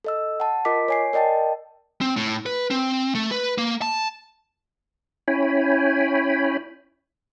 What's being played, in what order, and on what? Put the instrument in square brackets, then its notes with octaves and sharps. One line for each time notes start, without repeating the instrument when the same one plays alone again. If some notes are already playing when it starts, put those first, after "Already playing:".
[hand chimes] A4 D#5 E6
F#5 A5
F4 A#4 D#5 D6 B6
C#5 G#5 C7
A#4 D5 D#5 G5 A5
[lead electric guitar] C4
A2
B4
C4
A3
B4
A#3
A5
[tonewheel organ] C#4 E4 C#5 G5 G#5 B5